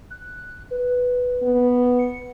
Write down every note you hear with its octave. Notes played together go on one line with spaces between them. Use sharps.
F#6
B4
B3
C#7